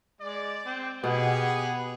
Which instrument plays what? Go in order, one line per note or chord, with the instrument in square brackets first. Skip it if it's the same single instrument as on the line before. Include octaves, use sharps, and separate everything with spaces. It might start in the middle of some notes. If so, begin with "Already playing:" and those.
[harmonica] G#3 [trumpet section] D5
[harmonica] C4
[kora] B2 [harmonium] G4 [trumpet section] G#4 [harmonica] B4 F#5